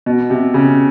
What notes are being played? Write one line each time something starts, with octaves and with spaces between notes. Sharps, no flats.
B2
C3
C#3